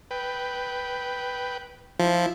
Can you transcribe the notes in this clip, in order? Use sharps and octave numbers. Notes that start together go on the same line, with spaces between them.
B4 G5
F3 E4